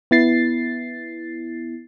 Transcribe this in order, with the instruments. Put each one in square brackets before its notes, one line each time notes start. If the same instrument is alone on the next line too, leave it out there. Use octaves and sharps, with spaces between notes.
[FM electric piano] B3 E4 A6 C7